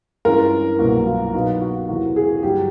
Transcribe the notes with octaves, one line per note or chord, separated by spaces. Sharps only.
G2 E3 G#3 C#4 F4 A#4
C2 B2 F#3 A#3 F#4
F4
B2 F#3 B3 D#4 F4
F#4
E2 C3 E3 F#4
G#4
G2 D3 F#3 G4